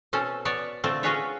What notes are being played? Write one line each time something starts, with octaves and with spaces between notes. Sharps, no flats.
B2 C4 C#4 A4
B3 C#5 D5 A5
D3 A3 C4 F4 A5
C#4 F4 F#4 G#4 B4 C#5